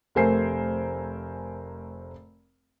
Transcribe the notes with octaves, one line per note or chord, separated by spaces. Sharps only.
F1 A3 A#4 C5 G#5 C7